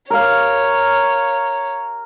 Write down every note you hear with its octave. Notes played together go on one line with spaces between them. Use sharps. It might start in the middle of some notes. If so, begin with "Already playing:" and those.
A#4 C#5 F5